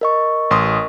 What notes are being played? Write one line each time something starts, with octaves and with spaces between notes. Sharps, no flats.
A#4 D#5 C#6
A1 C6 D#6